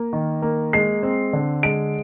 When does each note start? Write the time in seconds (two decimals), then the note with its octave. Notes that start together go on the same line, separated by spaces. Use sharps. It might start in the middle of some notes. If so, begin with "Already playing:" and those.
Already playing: A#3
0.13 D#3
0.42 A#3
0.73 G#3 C7
1.03 C4
1.33 D3
1.63 G#3 D7